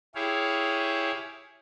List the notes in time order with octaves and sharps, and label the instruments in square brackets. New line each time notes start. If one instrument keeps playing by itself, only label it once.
[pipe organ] E4 G4 G#4 C#5 F5